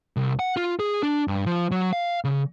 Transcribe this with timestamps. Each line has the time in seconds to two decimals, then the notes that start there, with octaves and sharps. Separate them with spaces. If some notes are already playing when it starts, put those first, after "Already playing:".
0.17 C2
0.39 F#5
0.57 F4
0.80 G#4
1.03 D4
1.28 G2
1.46 F3
1.71 F#3
1.93 F5
2.24 C#3